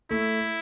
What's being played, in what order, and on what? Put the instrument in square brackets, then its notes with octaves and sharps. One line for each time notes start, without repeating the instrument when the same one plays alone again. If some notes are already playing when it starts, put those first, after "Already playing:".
[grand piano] A3 [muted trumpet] E4